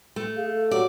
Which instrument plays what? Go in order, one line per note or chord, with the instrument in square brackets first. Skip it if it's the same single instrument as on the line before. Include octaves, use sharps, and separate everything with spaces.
[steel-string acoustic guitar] A3
[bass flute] G#4 [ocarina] F5
[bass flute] A4
[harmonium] F#3 [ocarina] G4 [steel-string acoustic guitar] D5